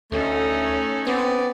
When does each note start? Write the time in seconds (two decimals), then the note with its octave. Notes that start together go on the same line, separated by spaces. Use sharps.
0.12 D2 A3 C#4 D#4 A4
1.07 B3 C4 D5